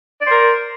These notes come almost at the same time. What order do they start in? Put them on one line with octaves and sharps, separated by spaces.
D5 C5 A#4